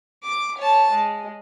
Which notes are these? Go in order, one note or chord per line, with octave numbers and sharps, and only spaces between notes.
D6
C#5 A5
G#3